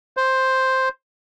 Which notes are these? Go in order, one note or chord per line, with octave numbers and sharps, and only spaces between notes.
C5